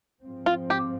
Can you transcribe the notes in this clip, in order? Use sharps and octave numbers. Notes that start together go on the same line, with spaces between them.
G#2 F3 C4
F4
G4